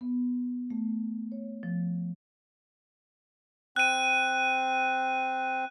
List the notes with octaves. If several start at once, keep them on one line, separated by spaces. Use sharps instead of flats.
B3
A3
C#5
F3
C4 F#6 D#7